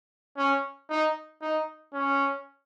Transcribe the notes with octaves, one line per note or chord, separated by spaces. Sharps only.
C#4
D#4
D#4
C#4